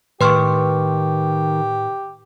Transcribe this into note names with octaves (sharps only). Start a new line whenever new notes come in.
A2 D#3 G4 B4 C6 C#6 F6